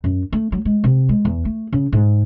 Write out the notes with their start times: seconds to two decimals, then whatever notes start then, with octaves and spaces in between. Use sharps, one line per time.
0.04 F#2
0.32 A3
0.52 F#3
0.65 G#3
0.84 C3
1.09 G#3
1.25 E2
1.45 A3
1.72 C#3
1.92 G#2